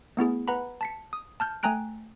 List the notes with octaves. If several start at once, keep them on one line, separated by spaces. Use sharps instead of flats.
A3 B3 E4 G#4
B4 F#5 A#5 B5
A5 B6 C#7
D#6
A5 F6 G6
A3 G5 G#5 A#5 F#6 D7